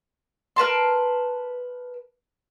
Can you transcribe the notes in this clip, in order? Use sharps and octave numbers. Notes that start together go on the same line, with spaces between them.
A#4 B4 A5 C6